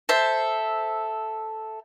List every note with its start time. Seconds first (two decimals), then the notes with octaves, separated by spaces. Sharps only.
0.09 A4 C5 E5